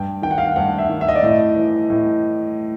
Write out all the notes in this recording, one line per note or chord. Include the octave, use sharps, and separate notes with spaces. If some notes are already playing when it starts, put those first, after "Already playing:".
Already playing: G2 G5
D#3 G5
F#5
F5
F#5
G2 F#5
E5
D#3
E5
D#5
D5
A2 D#5
E3
A2